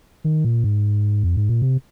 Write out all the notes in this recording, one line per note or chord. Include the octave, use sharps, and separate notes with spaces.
D#3
A#2
G#2
F2
G#2
A#2
C3